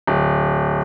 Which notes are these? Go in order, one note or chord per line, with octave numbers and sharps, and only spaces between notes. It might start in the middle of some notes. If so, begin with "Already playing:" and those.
D1